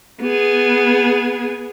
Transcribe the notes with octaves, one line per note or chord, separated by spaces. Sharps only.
B3 G#4